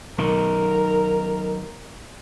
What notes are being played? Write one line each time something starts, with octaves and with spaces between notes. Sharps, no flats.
B1 D#3 A#4